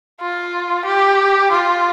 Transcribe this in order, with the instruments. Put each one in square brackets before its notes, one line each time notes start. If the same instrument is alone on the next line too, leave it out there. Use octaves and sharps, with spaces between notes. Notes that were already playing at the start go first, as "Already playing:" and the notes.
[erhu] F4
G4
F4